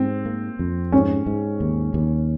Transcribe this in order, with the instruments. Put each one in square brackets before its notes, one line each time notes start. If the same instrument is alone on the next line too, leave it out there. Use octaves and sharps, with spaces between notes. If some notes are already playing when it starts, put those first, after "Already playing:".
Already playing: [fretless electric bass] G#2 [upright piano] C4
[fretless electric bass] A#3
F2
[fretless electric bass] G#2 [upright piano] C#4
[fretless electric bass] G#2
D#2
D#2